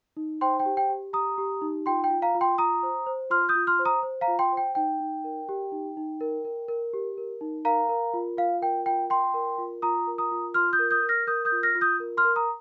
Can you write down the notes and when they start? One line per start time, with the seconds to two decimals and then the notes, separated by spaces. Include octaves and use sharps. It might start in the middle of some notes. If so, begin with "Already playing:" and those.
0.17 D#4
0.41 C5 G5 C6
0.60 G5
0.66 G4
0.77 G5
0.89 G4
1.13 G4 A#5 D#6
1.38 G4
1.61 D#4
1.86 F4 G5 C6
2.04 G5
2.10 F4
2.22 F5 A#5
2.35 F4
2.41 G5 C6
2.58 F4 A#5 D#6
2.83 C5
3.06 C5
3.30 F4 C6 F6
3.49 D#6 G6
3.55 F4
3.67 C6 F6
3.79 C5
3.85 A#5 D#6
4.03 C5
4.21 F5 A#5
4.28 F4
4.39 G5 C6
4.52 C5
4.57 G5
4.75 D#4 G5
5.00 D#4
5.24 A#4
5.49 G4
5.72 D#4
5.97 D#4
6.21 A#4
6.45 A#4
6.68 A#4
6.94 G4
7.18 A#4
7.41 D#4
7.65 A#4 F5 A#5
7.89 A#4
8.14 F4
8.37 F4 F5
8.62 A#4 G5
8.86 F4 G5
9.10 F4 G5 C6
9.34 A#4
9.58 F4
9.82 F4 A#5 D#6
10.07 A#4
10.18 A#5 D#6
10.31 F4
10.54 F4 C6 F6
10.73 D#6 G6
10.79 A#4
10.91 D#6 G6
11.03 A#4
11.09 F6 A#6
11.27 A#4 D#6 G6
11.45 D#6 G6
11.52 F4
11.63 F6 A#6
11.75 F4
11.81 D#6 G6
12.00 A#4
12.17 C6 F6
12.25 A#4
12.36 A#5 D#6